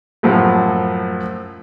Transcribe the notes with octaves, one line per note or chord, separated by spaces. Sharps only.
F#2 A2 F3